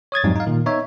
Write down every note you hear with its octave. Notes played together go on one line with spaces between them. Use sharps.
C#5 D#6 G#6 A6
F2 G#2 F#3 G3 D#4
D#4 F5
A#2 D#3
B3 D#4 C#5 E5